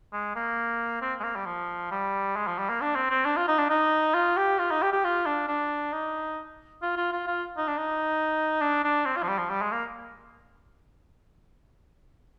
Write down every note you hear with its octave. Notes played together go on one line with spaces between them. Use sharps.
G#3
A#3
C4
G#3
A#3
G3
F3
G3
G#3
F3
G3
A#3
D4
C4
C4
D4
F4
D#4
D4
D#4
F4
G4
F4
D#4
G4
G4
F4
D4
D4
D#4
F4
F4
F4
F4
D#4
D4
D#4
D4
D4
C4
F4
F3
G3
F3
G3
G#3
A#3